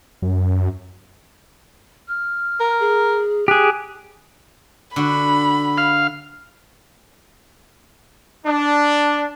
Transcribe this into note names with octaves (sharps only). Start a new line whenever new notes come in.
F#2
F6
A#4
G#4
G4 G#4 F#6
D3 F#4 B5
F5 F6
D4